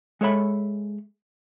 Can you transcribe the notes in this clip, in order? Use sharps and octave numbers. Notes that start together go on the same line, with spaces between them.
G#3 A4 C#5 E5 B5